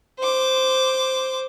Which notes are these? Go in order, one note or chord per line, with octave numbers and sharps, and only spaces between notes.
C5 D6